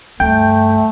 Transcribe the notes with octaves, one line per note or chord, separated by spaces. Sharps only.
D2 G2 A3 G5